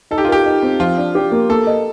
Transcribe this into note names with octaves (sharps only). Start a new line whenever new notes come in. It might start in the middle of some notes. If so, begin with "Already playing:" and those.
D#4 A4
G4
F4
G4 A#4
D#4
C4
F3 F4
D4
G4
A#3
A#3 A4
D#5